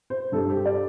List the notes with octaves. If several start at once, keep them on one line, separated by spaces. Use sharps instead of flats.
C5
G2 G3 A4
G4
D5